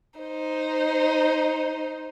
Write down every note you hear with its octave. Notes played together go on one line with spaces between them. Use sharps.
D#4 C5